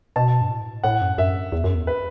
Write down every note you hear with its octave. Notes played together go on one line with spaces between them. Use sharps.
B2 A5
G2
A2
A2 F#5
F#2
F#2 E5
E2
F#2
E2
B4